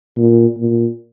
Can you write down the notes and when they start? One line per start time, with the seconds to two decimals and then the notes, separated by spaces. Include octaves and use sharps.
0.17 A#2
0.59 A#2